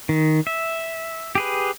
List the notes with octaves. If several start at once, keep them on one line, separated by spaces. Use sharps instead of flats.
D#3
E5
G4 G#4 B4